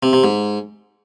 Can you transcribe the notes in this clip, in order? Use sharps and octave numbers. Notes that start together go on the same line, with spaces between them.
C3
C3
G#2